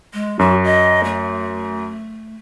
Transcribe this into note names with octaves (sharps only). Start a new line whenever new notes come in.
G#3
F#2 F#4
D#5
A3